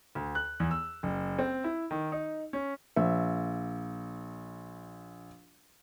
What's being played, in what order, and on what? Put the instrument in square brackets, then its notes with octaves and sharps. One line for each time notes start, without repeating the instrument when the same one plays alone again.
[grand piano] D2
F#6
E2
E6
F#1
C4
E4
D#3
D#4
C#4
[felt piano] A#1 E5